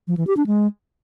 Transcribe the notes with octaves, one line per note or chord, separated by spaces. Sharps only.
F3
E3
G4
D4
G#3